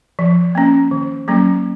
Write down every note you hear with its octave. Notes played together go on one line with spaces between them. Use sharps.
F3
A#3 C#4
D#3
F#3 A#3 C#4